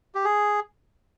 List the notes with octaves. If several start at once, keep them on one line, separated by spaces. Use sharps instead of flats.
G4
G#4